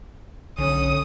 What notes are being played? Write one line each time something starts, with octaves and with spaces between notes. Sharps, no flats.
B1 D3 C#4 D#6